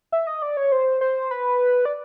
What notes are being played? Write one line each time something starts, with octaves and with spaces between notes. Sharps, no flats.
E5
D#5
D5
C#5
C5
C5
B4
D5